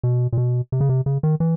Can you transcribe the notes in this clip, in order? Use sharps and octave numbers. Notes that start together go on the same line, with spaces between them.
B2
A#2
B2
C3
C#3
C3
C#3
D#3
E3